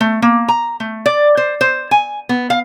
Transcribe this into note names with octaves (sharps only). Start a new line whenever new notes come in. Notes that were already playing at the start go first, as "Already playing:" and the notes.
A3
A#3
A#5
A3
D5
C5
C5
G#5
B3
F5